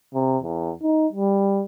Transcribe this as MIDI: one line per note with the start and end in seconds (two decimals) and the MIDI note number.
0.14 0.38 48
0.43 0.72 40
0.82 1.07 63
1.13 1.63 55